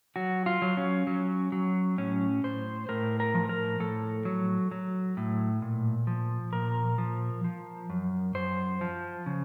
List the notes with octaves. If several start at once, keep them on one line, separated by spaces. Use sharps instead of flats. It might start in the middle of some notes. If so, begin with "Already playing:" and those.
F#3 F#4
F4
F#3
C#4
F#3
F#3
A2 C#4
A2 C5
A2 A#4
A#4
F3
A#4
A2 A4
F#3
F#3
A2
A#2
F3
A#2 A#4
F3
F3
F#2
F#2 C5
F3
C#3